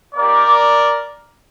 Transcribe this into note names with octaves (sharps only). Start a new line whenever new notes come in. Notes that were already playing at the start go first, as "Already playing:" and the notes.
A#3 D#4 G4 A#4 D5